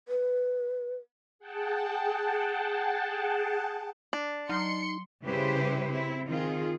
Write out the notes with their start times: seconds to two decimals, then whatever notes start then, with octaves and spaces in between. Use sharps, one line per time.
0.08 B4
1.39 G#4 F#5 G5 A5
4.13 D4
4.49 F#3 D#4 C6 F6 C#7
5.25 C#3 G3 E4 G4 B4 C5
5.92 C4 E4
6.28 D#3 C4 F4 G#4